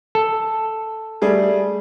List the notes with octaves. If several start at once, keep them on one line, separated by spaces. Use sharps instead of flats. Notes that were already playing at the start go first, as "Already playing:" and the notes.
A4
G3 A3 G#4